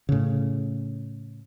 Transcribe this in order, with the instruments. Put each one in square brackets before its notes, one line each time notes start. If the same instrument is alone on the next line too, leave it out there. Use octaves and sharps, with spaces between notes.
[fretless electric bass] A2 C#3